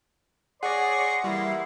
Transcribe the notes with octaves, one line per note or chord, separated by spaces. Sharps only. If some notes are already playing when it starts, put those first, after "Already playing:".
G#4 C#5 D5 F#5 C6 C#6 D#6 A#6
E3 G3 A#3 E4